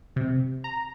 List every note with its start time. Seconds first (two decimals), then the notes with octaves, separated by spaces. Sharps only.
0.16 C3
0.64 A#5